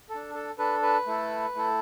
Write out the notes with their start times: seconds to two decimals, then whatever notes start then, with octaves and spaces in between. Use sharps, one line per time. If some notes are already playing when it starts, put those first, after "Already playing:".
0.09 A4
0.15 D4
0.34 A4
0.58 D4 A4 B4
0.83 B4
1.06 A3 E4 A4
1.55 A3 E4 A4